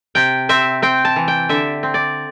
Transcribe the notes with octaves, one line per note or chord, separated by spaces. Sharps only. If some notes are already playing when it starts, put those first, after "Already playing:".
C3 G5
C4 E5
C4 G5
A5
E3
G5
D3 E5
C4
D5